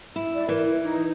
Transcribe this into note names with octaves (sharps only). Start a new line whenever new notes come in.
E4
D5
E3 A#4
E4
D#4